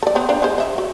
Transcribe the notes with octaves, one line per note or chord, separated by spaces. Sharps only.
A4 D5
B3 C4
F3 C4 D4
G3 G#3 C5
D#5 E5
F#4